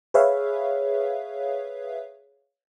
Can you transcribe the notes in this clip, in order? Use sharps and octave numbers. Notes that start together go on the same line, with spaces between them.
G#4 B4 C#5 E5 F5